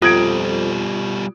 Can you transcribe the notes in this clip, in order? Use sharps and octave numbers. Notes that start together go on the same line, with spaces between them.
F2 B2 G3 F4 D#6 G#6 D7